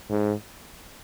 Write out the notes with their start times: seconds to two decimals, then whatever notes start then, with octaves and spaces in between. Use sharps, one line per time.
0.10 G#2